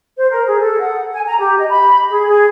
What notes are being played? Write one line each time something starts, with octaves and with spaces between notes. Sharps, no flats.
C5
A#4
G#4
A4
F#5
G#5
A#5
G4
D#5
B5
G#4
G#4